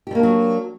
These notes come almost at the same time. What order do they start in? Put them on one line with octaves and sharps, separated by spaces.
G4 G3 A#3 D4 F#3